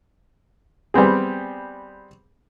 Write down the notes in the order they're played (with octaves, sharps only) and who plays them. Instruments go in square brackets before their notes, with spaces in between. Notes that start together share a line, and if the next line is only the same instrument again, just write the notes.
[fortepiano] G3 B3 C4 G#4